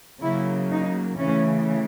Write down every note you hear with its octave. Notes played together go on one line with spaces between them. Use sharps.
C#3 F#3 A#3 E4
D#4
C#3 E3 A3 C#4